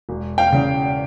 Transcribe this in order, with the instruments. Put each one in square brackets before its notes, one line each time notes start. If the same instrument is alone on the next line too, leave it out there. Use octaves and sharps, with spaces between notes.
[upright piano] E1
F5 G5
E2 C#3